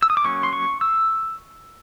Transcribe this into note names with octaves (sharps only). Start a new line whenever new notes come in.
E6
D#6
D6
F#3 A#3 C#4 C#6
C6
C#6
E6